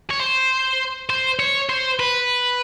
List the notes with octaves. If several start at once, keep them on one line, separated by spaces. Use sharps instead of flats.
C#5
C5
C5
C#5
C5
B4